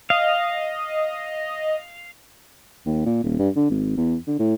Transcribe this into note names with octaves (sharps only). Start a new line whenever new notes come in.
D#5 F5
D#2
A#2
D#1
G2
D3
G#1
E2
D3
A2